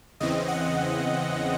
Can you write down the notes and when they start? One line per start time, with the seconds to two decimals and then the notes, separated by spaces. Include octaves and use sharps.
0.20 E2 C#3 E3 C4 D#5
0.48 F#5